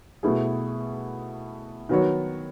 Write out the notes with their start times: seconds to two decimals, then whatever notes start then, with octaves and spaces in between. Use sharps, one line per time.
0.23 B2 A3 E4 G#4
1.89 D#3 F#3 B3 F#4 C#5